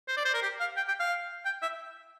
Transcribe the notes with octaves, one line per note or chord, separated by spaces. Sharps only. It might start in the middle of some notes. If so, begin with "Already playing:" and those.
C5
D5
C5
A#4
G4
F5
G5
G5
F5
G5
E5